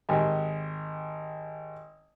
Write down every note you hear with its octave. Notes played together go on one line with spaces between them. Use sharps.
G#1 G4 G#5